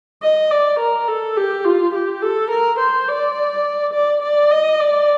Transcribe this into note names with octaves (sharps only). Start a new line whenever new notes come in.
D#5
D5
A#4
A4
G4
F4
G4
A4
A#4
C5
D5
D5
D5
D#5
D5